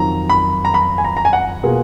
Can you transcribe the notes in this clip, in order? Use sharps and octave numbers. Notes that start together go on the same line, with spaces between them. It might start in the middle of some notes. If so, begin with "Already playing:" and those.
Already playing: F2 D#3 F#3 A#5
B5
A#5
B5
G#5
A#5
A#5
G#5
F#5
B2 A#3 F4 G#4